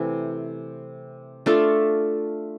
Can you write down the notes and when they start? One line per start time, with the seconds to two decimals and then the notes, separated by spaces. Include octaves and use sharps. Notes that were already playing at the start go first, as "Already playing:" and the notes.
Already playing: C3 E3 A3
1.46 A3 D4 F4 A4